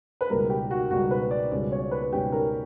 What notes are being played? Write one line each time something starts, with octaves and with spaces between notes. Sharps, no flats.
B4
C#2 B2 G3 A#4
G4
F#4
C#2 B2 G3 F#4
B4
D5
C#2 B2 G3 C#4 D5
C#5
B4
C#2 B2 G3 C#4 G4
A#4